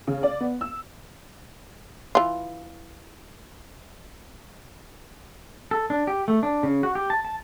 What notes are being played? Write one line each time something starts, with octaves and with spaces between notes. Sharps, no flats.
C#3
D5
B3
E6
E3 F4
A4
D4
G4
A3
D4
C#3
F#4
G4
A5
A5